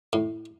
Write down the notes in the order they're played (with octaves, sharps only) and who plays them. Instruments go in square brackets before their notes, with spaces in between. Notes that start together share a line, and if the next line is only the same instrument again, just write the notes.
[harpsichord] A2